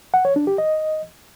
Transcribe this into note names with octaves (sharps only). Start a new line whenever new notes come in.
F#5
C#5
D4
G4
D#5